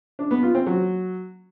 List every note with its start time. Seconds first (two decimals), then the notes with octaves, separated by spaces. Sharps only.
0.19 D4
0.31 B3
0.43 F4
0.55 C4
0.67 F#3